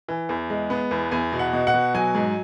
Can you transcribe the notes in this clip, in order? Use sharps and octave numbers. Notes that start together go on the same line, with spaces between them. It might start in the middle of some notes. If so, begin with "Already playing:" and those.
E3
E2
G#3
B3
E2
E2 G#5
B2
F#5
B2
F#5
B2
F#3 G#5
G#2